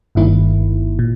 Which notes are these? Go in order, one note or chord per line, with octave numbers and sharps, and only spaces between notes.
G1 G2 D#3 A#3 E4
A#2